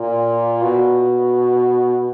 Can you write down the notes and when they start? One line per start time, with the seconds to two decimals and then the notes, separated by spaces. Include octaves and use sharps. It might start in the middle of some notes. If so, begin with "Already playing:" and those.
Already playing: A#2
0.62 B2